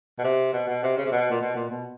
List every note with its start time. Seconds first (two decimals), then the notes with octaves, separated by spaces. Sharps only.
0.19 B2
0.24 C3
0.53 B2
0.68 B2
0.83 C3
0.97 C#3
1.06 C3
1.12 B2
1.31 A#2
1.41 B2
1.56 A#2
1.70 B2